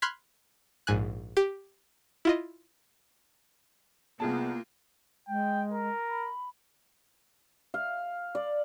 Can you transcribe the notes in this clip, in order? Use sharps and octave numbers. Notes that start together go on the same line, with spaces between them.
B5 C6 F6 F#6 G#6 B6
A#1 G#2 G#5 F#6
G4
E4 F4 D#5
C2 A#3 B3 F4 G#4 A5
G#3 G5
A#4
B5
F5
D5